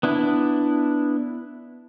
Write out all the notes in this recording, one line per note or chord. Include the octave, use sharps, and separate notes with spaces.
B3 D4 E4